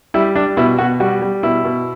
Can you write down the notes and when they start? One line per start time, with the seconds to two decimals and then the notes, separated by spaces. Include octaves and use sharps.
0.14 G3 E4
0.36 G3 D4
0.57 B2 E4
0.78 B2 F#4
1.00 G3 F#4
1.22 G3
1.43 B2 E4
1.65 B2